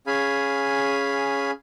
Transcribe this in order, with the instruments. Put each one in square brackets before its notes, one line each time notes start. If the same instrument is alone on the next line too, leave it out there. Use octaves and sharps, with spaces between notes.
[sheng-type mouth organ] C#4 G#4 F5 G#5 B5